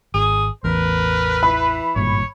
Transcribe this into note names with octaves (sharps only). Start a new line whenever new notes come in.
G#1 G#4
A1 E2 A#4 B4
E3 B5
G#1 G2 A#2 C#5